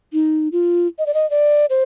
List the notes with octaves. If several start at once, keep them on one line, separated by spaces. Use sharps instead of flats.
D#4
F4
D#5
D5
D#5
D5
C5